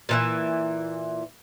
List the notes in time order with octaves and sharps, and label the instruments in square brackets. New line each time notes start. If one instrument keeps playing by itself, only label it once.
[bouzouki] A#2 E3 E5